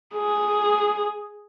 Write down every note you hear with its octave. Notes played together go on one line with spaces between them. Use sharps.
G#4